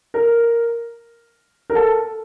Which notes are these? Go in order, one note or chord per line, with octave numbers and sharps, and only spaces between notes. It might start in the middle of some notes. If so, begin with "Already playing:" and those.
A#4
A#4
A4